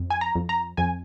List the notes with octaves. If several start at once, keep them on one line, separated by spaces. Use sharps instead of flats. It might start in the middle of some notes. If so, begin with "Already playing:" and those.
Already playing: F2
G#5
A#5
F2
A#5
F2 G#5